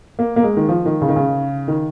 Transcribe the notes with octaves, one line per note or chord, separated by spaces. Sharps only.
A#3
A#3
G#3
D#3
F3
D#3
C#3
D#3
C#3
D#3